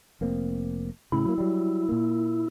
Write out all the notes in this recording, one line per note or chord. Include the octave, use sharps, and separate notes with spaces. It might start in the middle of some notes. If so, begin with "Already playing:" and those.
F1 A#3 C4
A2 C#3 E4
F#3 A#3
F#3 G3
A#2 A#3